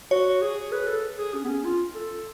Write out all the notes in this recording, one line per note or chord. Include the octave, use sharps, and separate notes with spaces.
F#4 C#5
G#4
B4
A4
G#4
C#4
B3
C#4
F4
A4